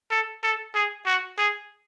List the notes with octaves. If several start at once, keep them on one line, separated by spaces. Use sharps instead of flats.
A4
A4
G#4
F#4
G#4